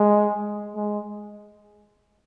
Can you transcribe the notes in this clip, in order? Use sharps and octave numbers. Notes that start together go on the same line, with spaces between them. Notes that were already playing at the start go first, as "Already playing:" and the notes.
Already playing: G#3
G#3